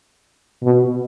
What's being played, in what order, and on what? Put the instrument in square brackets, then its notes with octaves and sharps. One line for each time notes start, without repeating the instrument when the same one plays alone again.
[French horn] B2